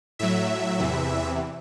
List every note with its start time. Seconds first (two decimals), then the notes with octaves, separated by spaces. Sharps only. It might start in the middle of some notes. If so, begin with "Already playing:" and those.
0.19 A2 F#3 E5
0.79 E2 C3 E3